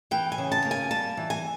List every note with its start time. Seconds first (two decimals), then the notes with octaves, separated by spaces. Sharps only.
0.11 E3 G5
0.32 G#5
0.38 C#3
0.52 A5
0.65 A#3
0.71 G#5
0.91 G3 A5
1.17 E3
1.30 G#5